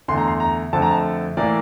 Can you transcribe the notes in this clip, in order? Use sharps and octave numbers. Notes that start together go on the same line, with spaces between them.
E2 D3 A3 C6
A#5
C6
A#5
F2 D3 A3 A5
A#5
A5
A2 E3 A#3 D5